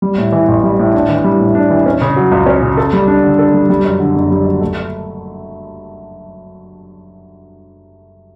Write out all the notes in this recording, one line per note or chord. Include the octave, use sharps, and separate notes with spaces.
G3
A2
E3
A1
G3
A2
D4
E3
G3
A2
D4
E3
C#4
C#3
F#3
C#2
C#4
C#3
A4
G3
D4
D3
A4
G3
G3
F#2
D3
F#1
G3
F#2
A3